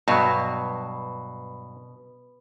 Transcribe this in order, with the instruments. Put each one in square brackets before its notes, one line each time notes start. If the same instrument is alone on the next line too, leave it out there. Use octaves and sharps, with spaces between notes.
[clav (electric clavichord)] G2 F#3 [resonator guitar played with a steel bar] B2